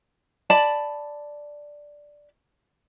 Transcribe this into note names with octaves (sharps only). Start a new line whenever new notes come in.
D5 A5 B5